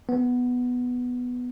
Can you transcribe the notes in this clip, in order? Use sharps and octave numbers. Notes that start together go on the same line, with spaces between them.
B3